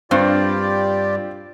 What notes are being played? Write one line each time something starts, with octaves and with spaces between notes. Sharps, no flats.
G2 C4 F4 G4 D5